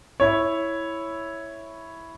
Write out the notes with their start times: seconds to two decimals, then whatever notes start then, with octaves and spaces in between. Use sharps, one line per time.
0.20 E4 C#5